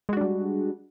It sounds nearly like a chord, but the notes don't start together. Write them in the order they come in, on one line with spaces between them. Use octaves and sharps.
G#3 F#4 D4 G3